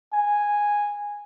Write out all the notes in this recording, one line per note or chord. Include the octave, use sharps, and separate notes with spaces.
G#5